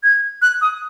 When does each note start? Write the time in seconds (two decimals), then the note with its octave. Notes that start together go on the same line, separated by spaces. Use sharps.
0.04 G#6
0.42 F#6
0.61 D#6